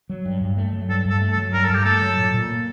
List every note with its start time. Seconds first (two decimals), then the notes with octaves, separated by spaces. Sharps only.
0.10 F#3
0.25 G2
0.41 G2
0.57 A3
0.73 F#3
0.89 G2 A4
1.05 G2
1.10 A4
1.21 A3
1.33 A4
1.37 F#3
1.53 G2 A#4
1.64 A4
1.70 G2
1.75 G4
1.85 A3 A4
2.02 F#3
2.17 A#2
2.34 A#2
2.49 A#3